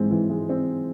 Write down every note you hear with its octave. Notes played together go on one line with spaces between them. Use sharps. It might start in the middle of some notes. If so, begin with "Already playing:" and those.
Already playing: G#2 E3 G#3 C4
E3
G#3
C4